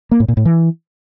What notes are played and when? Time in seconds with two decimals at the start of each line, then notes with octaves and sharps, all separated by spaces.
0.11 A#3
0.20 A2
0.28 A#2
0.37 A2
0.45 E3